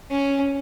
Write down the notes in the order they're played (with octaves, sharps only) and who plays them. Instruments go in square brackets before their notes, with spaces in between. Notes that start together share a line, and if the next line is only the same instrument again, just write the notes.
[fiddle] C#4